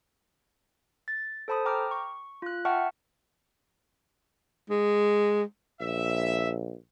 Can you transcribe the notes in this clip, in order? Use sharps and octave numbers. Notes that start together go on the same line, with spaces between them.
A6
A4 C5 A5 B5 D#6
G5 A#5 D6 F6
C#6
F4 F#6
E5 F#5 G5 A5 C#6 F6
G#3
A#1 E5